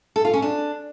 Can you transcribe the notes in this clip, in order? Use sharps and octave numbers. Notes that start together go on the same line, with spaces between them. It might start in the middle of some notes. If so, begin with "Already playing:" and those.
A4
F4
C#4
D4